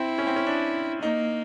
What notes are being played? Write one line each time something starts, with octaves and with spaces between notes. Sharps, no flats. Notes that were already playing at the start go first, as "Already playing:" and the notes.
Already playing: C4 E4
C#4
C4
C#4
D4
A#3 D#4